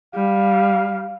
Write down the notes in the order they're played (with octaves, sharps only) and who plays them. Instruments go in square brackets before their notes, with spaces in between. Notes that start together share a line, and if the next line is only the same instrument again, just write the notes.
[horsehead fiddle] G3 [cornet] F5